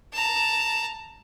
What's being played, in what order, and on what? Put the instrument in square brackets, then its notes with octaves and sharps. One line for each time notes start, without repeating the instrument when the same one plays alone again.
[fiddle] A5 A#5